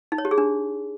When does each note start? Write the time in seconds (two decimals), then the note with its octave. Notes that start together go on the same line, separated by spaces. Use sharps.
0.12 D#4
0.18 C#5
0.25 G4
0.31 G#4
0.38 D4